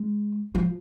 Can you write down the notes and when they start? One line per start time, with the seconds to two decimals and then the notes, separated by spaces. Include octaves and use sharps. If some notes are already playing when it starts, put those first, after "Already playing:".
Already playing: G#3
0.55 F3